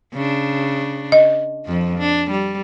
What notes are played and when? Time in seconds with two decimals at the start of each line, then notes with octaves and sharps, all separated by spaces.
0.13 C#3 D4
1.12 D#5
1.65 F2 F3
1.98 D4
2.31 G3